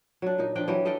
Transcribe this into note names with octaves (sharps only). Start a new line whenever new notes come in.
F#3 D4
A#2 D#4
F3 D4 D5 G5
E3 F#3 G4
A4 D#5 F5 G5